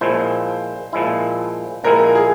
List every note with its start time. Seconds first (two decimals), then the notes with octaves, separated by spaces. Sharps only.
0.01 A#2 F3 G#3 E4 C5
0.93 A#2 F3 G#3 E4
1.84 A#2 F3 G#3 E4 A#4
2.15 G#4